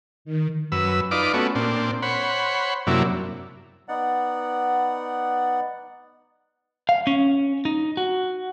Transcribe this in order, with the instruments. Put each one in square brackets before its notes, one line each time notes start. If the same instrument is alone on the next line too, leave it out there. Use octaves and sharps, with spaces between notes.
[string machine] D#3
[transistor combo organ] F#2 B4 E6
D#4 F4 B4 D5 D6
A3 B3 C#4 F#4
A#2 C4 D4
C5 C#5 F#5 B5
F#2 C3 F#3 A#3 D4 E4
[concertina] B3 D#4 D5 F#5
[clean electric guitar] F5
C#4
D#4
F#4